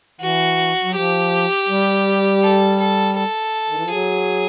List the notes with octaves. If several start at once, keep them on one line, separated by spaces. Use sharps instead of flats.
E3 F#4
F#3
F3 G4
G3
A4
A4
A4
D#3
E3
F3
F#3 G#4